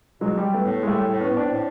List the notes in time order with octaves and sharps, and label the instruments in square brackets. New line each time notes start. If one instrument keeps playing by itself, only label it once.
[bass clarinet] B2 [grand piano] F#3 G#3
[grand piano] G3
A3 B3
[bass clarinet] A2
[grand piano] G#3
[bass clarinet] A2 [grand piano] G3 A3
[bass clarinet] A2
[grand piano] B3 C#4
[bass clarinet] A2
[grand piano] C4 D4
[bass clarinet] A2